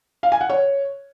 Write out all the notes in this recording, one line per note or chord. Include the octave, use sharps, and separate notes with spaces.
F5
G#5
F#5
C#5